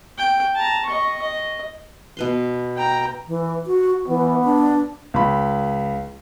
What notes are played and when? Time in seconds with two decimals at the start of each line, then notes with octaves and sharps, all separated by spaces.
0.18 G5
0.56 A5 A#5
0.85 D#5 C#6
1.21 D#5
2.17 B2 B4 C6
2.77 G5 A#5
3.28 E3
3.67 F#4
4.08 E3 B3
4.44 D4
5.14 C#2 B5